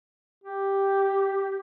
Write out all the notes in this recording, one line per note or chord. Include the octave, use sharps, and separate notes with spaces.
G4